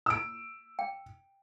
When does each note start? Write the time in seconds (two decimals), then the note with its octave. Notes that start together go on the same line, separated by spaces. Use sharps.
0.06 E6 D7
0.79 G5